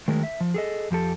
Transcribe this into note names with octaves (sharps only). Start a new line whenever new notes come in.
D#3 F#3 G#3 A3 A#4
E5
F3
G#4 A4 D#5
F2 F3 G4 A4